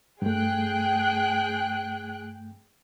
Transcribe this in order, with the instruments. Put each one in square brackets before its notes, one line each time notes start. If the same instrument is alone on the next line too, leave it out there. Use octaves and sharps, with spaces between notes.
[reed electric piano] G2 A3 [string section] G#4 G5 F#6